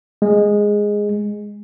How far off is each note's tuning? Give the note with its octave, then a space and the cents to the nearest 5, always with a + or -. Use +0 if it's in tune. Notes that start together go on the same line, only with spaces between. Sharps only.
G#3 -5